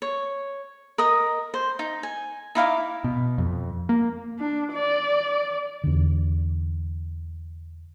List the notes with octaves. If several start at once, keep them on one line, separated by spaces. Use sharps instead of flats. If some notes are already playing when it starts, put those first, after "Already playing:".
C#5
A#4 D#5 D#6
C5
D#4
G#5
D#4 E4 F5 D6
B2
F2
A#3
D4
D5
E2 D3